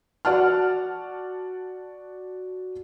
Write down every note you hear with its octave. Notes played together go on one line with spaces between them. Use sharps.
F#4 D5 F#5 A5 F6